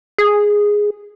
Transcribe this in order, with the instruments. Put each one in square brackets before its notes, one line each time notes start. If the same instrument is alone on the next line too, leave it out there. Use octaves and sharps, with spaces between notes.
[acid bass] G#4